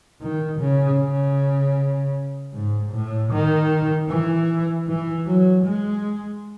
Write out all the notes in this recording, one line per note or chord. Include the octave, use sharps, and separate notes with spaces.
D#3
C#3
C#3
G#2
A2
D#3
E3
E3
F#3
G#3